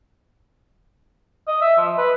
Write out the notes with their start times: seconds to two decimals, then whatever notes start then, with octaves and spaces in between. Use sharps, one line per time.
1.47 D#5
1.61 E5
1.77 F3
1.98 B4